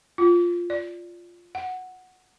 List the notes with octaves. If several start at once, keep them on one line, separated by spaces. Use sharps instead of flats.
F4
D5
F#5